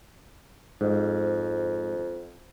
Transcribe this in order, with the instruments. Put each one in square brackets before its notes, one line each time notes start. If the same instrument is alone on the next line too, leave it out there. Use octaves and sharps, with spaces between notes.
[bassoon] F2 [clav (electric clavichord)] G#2